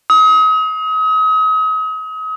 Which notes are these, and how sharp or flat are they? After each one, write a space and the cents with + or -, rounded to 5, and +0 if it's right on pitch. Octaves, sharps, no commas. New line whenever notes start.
D#6 +35